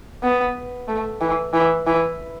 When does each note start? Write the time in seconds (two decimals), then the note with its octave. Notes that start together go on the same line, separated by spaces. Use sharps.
0.23 B3
0.88 A3
1.21 E3
1.53 E3
1.87 E3